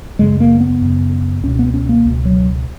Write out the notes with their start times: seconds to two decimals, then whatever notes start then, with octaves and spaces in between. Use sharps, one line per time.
0.19 F#2 C#3 G#3
0.40 A#3
0.60 B3
0.82 F#2 C#3
1.43 C#2 B2 C#4
1.59 B3
1.74 C#4
1.89 A#3
2.05 C#2 B2
2.25 F#3